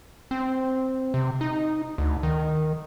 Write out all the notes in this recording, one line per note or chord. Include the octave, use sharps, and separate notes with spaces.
C4
C3
D#4
D2
D#3